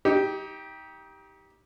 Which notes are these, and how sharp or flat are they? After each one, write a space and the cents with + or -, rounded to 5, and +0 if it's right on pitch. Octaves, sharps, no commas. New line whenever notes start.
D#4 +30 G4 +0